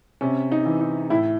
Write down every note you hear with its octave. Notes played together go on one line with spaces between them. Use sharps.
C3 C#4
D#4
E3
D#4
A2 E4